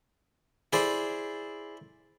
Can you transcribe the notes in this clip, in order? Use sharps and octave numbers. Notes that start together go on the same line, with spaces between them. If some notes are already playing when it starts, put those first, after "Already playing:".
E4 G#4 C5 D5